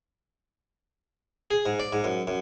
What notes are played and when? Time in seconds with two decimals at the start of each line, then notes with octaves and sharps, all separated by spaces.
1.51 G#4
1.66 G#2
1.79 D5
1.93 G#2
2.04 F#2
2.27 F#2